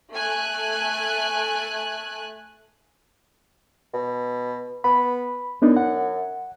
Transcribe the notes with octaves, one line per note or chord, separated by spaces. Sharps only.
A3 G#5 F#6
B2
B3 B5
F#2 B3 D4 D#4
F#5